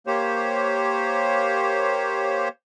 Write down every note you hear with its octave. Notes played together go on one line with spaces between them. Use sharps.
A#3 G4 C5 C#5